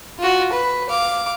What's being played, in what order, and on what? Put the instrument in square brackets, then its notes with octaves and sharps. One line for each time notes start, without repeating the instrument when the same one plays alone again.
[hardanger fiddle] F4 F#4
B4
F5 D6